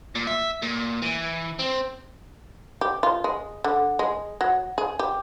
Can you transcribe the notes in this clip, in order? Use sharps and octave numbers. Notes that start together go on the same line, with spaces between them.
A#2
E5
A#2
E3
C4
G4
F4
G#3
D3
G#3
F#3
G#4
G4